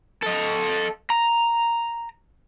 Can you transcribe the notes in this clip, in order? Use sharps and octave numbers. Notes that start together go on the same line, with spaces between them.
A4 D#5
A#5